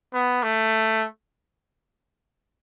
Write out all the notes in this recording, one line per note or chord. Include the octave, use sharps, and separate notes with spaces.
B3
A3